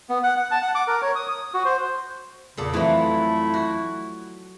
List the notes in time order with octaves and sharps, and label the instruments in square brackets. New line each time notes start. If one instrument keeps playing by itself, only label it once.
[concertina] B3
F#5
F#5
A5
F#5
D6
A#4
C#5
D#6
D#6
F#4
C5
[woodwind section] E2 C#3 [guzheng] A#2 A4 D5
[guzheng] F2 E3 F#3 [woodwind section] A3 E4
[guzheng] F#4